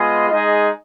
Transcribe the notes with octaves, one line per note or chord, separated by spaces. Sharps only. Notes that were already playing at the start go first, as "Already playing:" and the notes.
Already playing: G#3 B3 F4 G#4 D#5
G#3 D#4 G#4 D#5